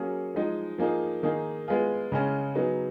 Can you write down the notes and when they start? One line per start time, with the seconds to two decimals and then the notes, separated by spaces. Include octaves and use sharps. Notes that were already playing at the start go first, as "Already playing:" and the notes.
Already playing: F#3 A#3 C#4 G#4
0.35 F3 G#3 D#4
0.78 F3 A#3 D#4 G#4
1.23 D#3 A#3 D#4 G#4
1.68 G#3 B3 F4 G#4
2.12 C#3 G#3 C#4
2.55 F#3 B3 D#4 G#4